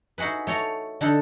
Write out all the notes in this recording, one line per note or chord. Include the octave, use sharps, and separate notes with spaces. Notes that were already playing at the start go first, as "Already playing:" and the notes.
D#4 E4 F#4 G#4 B4
A3 C#5 A5 A#5
D3 D4 D#4 A4